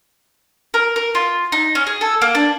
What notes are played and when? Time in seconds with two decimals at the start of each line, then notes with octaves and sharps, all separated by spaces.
0.74 A#4
0.96 A#4
1.15 F4
1.52 D#4
1.75 C#4
1.87 G#4
2.01 A4
2.22 A#3
2.35 D4